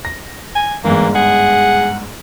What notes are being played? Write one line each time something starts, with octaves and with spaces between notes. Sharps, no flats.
A#6
G#5
G1 G#2 E3 A#3
G#4 F#5